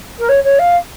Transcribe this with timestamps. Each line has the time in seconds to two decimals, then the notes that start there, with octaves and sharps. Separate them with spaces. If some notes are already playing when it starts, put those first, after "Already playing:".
0.19 A#4
0.28 C#5
0.43 C#5
0.59 F5